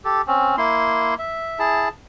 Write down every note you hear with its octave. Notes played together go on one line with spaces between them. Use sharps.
G4 A4
C4 C#4
A#3 E4 C6
E5
E4 G#4 A5